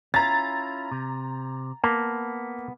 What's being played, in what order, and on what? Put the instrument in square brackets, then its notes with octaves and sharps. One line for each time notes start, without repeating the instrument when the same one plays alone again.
[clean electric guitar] C#4 E4 F4 [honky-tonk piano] A#5 A6
[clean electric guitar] C3
[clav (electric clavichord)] A#3 [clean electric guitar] B3 A5